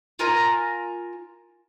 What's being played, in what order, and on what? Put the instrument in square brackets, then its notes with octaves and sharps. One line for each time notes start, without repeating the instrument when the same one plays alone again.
[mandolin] F4 A#4 G#5 A#5